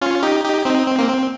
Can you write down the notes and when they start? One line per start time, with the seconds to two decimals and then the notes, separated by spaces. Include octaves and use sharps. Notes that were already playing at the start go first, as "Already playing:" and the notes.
0.01 C#4 F4
0.23 D#4 G4
0.45 D#4 G4
0.65 C4 D#4
0.87 C4
0.99 A#3
1.09 C4